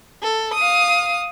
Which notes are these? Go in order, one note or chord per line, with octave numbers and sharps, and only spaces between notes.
A4
F5 D#6